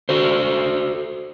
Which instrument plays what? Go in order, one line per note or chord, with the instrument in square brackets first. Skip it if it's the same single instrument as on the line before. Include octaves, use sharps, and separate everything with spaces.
[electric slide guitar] F#4 A4 C5